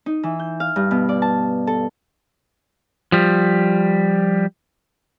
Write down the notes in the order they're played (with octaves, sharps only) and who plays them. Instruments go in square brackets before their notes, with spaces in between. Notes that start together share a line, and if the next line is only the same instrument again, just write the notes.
[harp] D#4
E3
G6
F5
G2
B2
D5
A5
A4
[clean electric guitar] F3 G3